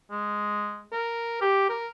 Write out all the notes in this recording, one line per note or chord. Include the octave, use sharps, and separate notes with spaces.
G#3
A#4
G4
A#4